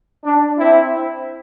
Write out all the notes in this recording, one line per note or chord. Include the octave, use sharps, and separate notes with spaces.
D4
C4 E4